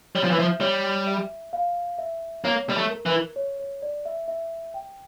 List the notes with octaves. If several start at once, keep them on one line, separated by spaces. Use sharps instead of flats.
G3 C#5
F3
E3
F3 E5
G3 C#5
E5
F5
E5
A#3 C#5
G3
A3
A#4
E3
C#5
C#5
D5
E5
E5
G5